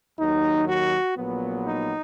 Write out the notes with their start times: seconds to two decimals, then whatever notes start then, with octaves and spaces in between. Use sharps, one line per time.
0.19 D#2 D#3 F#3 D#4
0.68 F#4
1.17 A#1 A#2 F#3 B3
1.65 D#4